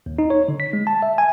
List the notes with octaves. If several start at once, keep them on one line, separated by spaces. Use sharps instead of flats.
D#2
D#4
C#5
D3
B6
G#3
A5
E5
G#5